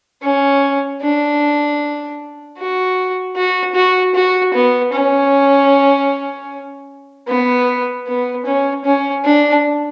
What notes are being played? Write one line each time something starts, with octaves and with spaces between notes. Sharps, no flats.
C#4
D4
F#4
F#4
F#4
F#4
B3
C#4
B3
B3
C#4
C#4
D4